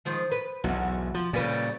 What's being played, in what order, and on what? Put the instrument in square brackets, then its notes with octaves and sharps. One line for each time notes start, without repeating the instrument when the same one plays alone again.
[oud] D#3 F3 G#3
B4
[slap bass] B1 E2 [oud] F#4
[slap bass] F3
[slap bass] A#2 C#3 [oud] G3 B4